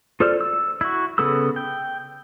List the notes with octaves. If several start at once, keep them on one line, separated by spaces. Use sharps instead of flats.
F4 A4 C5 D5 F6
E6
E4 F#4
C#3 B3 A4 B5 E6
G5